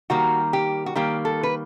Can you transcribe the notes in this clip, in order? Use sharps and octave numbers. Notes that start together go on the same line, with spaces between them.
D#3 G3 A#3 F#4
G4
F#4
D#3 G3 A#3 G4
A4
B4